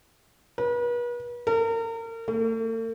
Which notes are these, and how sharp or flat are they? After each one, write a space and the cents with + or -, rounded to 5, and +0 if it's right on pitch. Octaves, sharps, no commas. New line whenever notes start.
B4 -40
A#4 -35
A3 +45